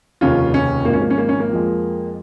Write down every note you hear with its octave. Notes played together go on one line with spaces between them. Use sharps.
F1 D#2 C#3 F3 C#4 F4
C#4
G#1 G#2 F3 A#3
C#4
A#3
C#4
A#3
C#4
A#3
F2 F3 G#3